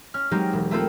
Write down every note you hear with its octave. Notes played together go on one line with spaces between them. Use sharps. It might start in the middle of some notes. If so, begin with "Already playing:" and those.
C#4 F6
F#3 G#3 C4 D#4 G4
E1
A3 A#3 C4 F4 A4